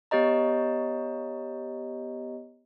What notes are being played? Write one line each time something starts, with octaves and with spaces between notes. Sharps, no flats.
B3 G4 C#5 D#5 A#5